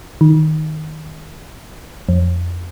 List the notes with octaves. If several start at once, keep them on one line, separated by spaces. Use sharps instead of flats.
D#3
F2